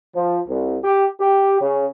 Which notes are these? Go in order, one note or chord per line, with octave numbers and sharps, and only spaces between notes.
F3
C2
G4
G4
C#3